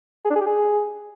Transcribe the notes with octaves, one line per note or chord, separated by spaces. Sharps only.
G#4
D4
G#4
G4
G#4